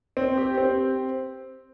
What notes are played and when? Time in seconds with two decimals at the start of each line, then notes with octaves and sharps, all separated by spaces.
0.17 C4
0.37 G4
0.58 C4